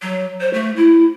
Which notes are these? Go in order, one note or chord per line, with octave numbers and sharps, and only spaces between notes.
F#3
C5
A3
E4